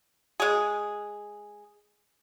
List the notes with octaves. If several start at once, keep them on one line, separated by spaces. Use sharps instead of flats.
G#3 G#4